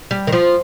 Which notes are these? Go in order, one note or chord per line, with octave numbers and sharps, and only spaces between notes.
G3
D#3
F3